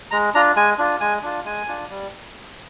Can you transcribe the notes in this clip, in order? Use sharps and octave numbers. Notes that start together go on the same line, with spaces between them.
G#3 A#5
D4 F4 A#5
G#3 G#5
D4 F4
G#3 G#5
D4 F4
G#3 G#5
D4 F4
G3